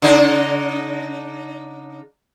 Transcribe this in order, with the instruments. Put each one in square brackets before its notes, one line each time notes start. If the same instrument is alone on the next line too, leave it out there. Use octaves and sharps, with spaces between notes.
[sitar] C#3 D4 D#4